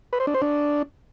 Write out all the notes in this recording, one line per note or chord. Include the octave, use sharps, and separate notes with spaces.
B4
C5
D4
C5
D4